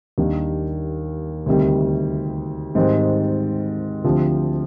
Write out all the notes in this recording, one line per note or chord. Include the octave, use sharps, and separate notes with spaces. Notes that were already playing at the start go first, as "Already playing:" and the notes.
D#2 D#3 G3 A#3 D4
D2 C3 D#3 G3
G#2 D#3 G3 C4
D2 D3 F3 C4 G4